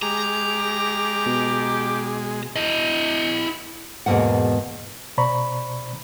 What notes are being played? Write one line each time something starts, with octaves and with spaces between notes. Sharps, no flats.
G#3 G4 A#5
B2
E4 D#5
E2 G#2 B2 E3 A#3 F#5
B2 C5 D5 A#5 B5 C#6